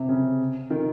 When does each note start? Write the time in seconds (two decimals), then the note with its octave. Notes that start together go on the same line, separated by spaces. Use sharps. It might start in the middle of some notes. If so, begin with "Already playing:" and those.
Already playing: C3
0.09 C#3
0.70 D#3